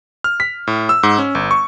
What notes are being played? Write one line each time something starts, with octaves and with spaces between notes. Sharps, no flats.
F6
B6
A2
E6
G#2
C#4
G1
C#6